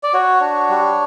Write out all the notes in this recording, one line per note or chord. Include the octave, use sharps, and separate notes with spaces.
D5
F#4 C#5
D4
G3